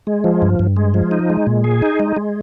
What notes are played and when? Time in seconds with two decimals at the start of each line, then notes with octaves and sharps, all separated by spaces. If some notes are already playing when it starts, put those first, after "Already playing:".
0.07 G#3
0.24 F3
0.42 G2
0.59 G2
0.76 G#3
0.94 F3
1.11 D#4
1.30 G#3
1.47 A#2
1.64 G#4
1.82 D#4
2.00 G#3
2.16 G#3